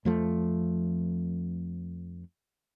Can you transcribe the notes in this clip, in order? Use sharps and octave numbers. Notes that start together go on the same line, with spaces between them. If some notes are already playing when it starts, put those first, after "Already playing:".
F2 F3 A3